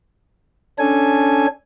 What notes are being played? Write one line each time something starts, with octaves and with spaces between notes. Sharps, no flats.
C#4 D4 A4 G#5